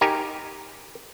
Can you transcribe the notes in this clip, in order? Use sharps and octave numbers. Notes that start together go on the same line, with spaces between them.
D#4 G4 A#4 G#5